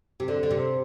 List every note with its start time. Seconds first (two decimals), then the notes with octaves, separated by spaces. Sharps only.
0.20 C3
0.28 D3
0.43 D3
0.51 C3